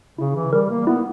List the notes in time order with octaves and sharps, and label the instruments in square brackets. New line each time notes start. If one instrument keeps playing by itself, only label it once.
[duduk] C#3 [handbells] E4
[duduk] E3
[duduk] G3 [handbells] A#4
[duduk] A#3
[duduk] B3 [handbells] E4